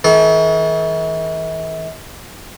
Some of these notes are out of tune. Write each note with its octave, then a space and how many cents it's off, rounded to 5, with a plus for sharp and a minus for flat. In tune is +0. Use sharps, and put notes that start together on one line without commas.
E3 -45 A4 -40